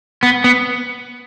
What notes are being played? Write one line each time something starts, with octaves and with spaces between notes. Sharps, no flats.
B3
B3